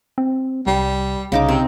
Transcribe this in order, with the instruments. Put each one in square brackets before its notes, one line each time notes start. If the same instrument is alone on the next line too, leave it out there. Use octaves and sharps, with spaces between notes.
[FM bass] C4
[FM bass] C2 [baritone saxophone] G3
[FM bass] C2 [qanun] C#3 D#4 D6
[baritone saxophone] C3 [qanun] C4